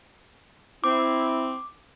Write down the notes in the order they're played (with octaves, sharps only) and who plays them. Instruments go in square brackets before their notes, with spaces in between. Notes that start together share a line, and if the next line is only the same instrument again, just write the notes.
[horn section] C4 [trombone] E4 [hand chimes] D6